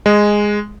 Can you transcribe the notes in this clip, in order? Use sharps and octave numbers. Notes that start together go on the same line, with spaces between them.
G#3